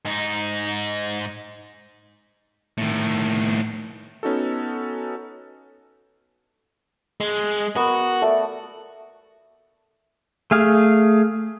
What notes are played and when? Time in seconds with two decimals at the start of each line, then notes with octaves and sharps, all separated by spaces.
0.05 G#2 D#4
2.78 A2 D#3
4.23 B3 C#4 D#4 F#4 A4
7.20 G#3
7.76 B3 F#4 A#4
8.22 A3 D5
10.51 A3 G#4 F5